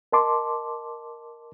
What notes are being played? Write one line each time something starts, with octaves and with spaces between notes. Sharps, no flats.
A#4 D#5 A5 C6 D6